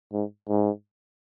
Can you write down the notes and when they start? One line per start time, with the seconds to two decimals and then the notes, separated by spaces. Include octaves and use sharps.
0.13 G#2
0.49 G#2